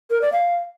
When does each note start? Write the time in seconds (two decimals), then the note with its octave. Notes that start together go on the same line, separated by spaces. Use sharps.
0.10 A#4
0.21 D5
0.33 F5